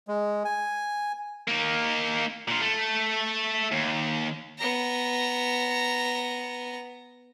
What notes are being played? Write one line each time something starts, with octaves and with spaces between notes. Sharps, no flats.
G#3
G#5
A#3 D#4
A#2 F3
A3
D#2
B3 A#5